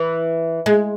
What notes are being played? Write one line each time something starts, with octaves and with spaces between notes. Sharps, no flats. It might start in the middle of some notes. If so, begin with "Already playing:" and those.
Already playing: E3
G#3